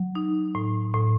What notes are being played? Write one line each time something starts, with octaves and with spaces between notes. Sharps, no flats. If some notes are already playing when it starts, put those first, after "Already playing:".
Already playing: F#3
D#4
A2
A2